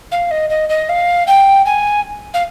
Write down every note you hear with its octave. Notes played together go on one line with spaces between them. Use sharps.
F5
D#5
D#5
D#5
F5
G5
G#5
F5